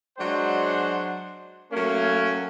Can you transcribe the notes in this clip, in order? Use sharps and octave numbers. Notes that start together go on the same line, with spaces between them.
F#3 G#3 D4 C5 F#5
F#3 A3 A#3 C#4